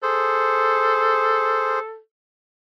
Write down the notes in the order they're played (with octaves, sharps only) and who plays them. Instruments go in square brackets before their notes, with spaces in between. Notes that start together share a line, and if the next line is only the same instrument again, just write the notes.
[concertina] G#4 C5 [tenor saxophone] A4